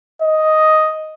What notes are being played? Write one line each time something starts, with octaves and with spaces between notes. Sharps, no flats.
D#5